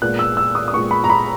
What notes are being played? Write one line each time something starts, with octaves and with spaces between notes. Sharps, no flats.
A#2 G#3 B3 F#6
E6
E6
D#6
D#6
A#2 G#3 B3 C#6
B5
A#5
B5